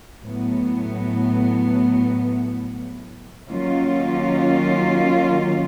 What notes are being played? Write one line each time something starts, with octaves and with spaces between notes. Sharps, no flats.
A2 F#3 B3
D#3 F#3 A#3 C#4 F4